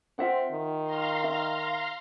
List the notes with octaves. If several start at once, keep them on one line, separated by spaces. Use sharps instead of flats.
C4 F4 E5 F#5
D#3
F5 A#5 C6
E5